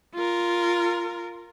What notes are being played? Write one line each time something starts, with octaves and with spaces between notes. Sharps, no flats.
F4 A#4